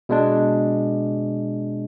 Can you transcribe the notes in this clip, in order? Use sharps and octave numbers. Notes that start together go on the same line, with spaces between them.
B2 G#3 D4